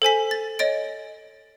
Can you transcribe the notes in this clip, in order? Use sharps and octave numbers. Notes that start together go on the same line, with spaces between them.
A4 C5 G#5 B6
A6
C#5 D#5 A6 D7